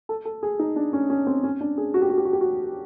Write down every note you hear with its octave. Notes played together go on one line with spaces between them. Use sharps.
A4
A4
G#4
D#4
D4
C#4
C#4
C4
C#4
D4
G#4
F#4
G4
F#4
G4
F#4
G4
F#4